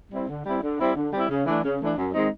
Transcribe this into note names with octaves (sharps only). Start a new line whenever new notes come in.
G3 C4 E4
D3
G3 C4 E4
D3
G3 C4 E4
D3
G3 C4 E4
C#3
E3 A3 D4
C#3
E3 A3 D4
F#2
D#3 G#3 C4 D#4